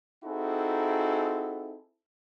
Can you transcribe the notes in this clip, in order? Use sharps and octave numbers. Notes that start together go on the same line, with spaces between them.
C4 D#4 E4 F#4 G#4 A4